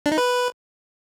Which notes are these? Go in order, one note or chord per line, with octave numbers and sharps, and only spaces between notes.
D4
D#4
B4